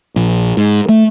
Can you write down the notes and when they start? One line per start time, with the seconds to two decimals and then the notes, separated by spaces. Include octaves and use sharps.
0.16 A#1
0.57 G#2
0.89 A3